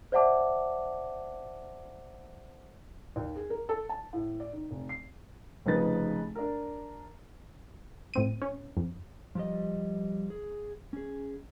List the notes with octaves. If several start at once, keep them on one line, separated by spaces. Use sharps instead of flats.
C5 D5 E5 F#5 A5 D6
D#2
G#4
A#4
A4
A5
A2
D5
D#3
F1
C7
F1 C#3 F3 D#4 B4 A6
D4 A#4
A2 C4 D#7
C#4
F2
F3 G3 D#5
G#4
C#4 G#4